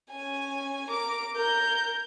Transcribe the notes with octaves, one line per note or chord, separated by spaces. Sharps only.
C#4 G#5
A#4 D6
A#4 G6